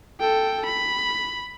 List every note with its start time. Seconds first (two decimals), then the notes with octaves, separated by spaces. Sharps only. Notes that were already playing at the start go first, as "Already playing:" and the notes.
0.20 A4 G5
0.66 B5